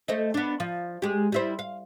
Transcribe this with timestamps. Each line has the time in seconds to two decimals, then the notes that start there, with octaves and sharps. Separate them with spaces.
0.08 A3 C5 D#5
0.34 B3 D4
0.60 F3
1.02 G#3 G4
1.32 G3 E4 C5
1.59 F5